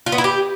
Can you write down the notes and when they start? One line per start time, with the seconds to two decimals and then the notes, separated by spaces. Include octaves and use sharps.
0.06 F4
0.12 B3
0.18 E4
0.24 G4